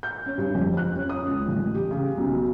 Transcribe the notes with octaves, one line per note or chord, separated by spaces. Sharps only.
G6
C#4
G2
F2
F#6
C#4
D#6
C#2
A1
G4
C#3
B1